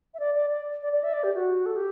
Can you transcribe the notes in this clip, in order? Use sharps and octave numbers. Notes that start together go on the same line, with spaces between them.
E5
D5
D5
D5
D5
D5
E5
D5
G4
F#4
A4
G4